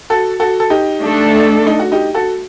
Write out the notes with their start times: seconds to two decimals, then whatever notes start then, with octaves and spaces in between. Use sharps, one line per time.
0.10 F#4 A4
0.40 F#4 A4
0.60 A4
0.70 D#4 G4
1.00 A3 D4 A4
1.67 D#4
1.79 F#4
1.92 D#4 G4
2.15 F#4 A4